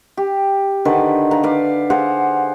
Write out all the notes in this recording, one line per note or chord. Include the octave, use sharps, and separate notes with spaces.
G4
D3 D#3 B4 D5
B4 F5 A#5
B4 D5 F5
G#4 C5 F5 F#5